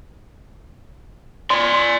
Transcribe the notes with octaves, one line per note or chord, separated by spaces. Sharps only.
D5 G#5 C6